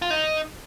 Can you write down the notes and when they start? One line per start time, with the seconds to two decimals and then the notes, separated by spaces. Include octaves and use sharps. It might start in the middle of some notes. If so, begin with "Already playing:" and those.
0.02 F4
0.10 D#4